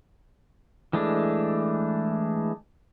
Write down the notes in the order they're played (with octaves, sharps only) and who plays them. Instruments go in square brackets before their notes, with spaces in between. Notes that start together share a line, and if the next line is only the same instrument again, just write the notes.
[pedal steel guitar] E3 G#3 A3 D4